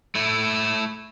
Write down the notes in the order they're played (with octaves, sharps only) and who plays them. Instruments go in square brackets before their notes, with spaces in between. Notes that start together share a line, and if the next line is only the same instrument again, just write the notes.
[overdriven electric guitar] A3 E4